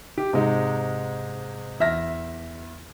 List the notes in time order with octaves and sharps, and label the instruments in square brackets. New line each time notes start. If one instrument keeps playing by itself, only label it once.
[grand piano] G4
G#2 C3 G#3 D#4
E2 E5 F6 A#6